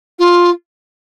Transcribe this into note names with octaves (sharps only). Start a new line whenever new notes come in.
F4